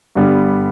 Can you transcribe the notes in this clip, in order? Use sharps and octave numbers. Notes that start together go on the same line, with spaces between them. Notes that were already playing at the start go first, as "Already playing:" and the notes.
G2 D3 G3 B3